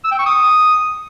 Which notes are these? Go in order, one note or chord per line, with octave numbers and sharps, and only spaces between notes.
E6
G5
C#6
D#6